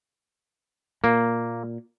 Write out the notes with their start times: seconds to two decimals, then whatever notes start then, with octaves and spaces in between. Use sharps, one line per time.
1.04 A#2 A#3